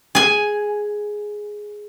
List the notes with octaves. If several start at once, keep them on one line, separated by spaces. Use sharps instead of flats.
G#4 G#5